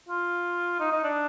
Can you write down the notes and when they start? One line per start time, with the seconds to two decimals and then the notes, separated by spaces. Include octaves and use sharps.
0.09 F4
0.80 D#4
0.92 D#4
1.04 D4